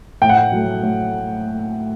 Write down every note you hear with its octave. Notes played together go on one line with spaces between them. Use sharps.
A2 G5
F#5
G5
F#3 A3
A2